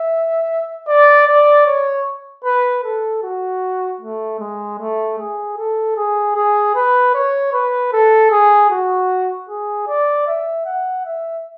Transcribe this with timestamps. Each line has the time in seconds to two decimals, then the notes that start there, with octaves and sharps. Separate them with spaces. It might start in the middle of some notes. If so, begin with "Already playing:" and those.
Already playing: E5
0.88 D5
1.27 D5
1.66 C#5
2.44 B4
2.84 A4
3.23 F#4
4.01 A3
4.40 G#3
4.79 A3
5.19 G#4
5.57 A4
5.97 G#4
6.36 G#4
6.75 B4
7.14 C#5
7.53 B4
7.93 A4
8.31 G#4
8.70 F#4
9.49 G#4
9.87 D5
10.27 E5
10.66 F#5
11.05 E5